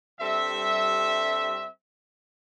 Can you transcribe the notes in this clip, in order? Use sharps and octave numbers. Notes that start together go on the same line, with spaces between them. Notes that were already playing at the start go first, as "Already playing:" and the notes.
G2 G3 C4 A4 E5